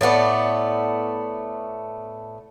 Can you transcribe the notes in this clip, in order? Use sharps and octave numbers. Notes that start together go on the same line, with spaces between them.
A2 A3 B3 D5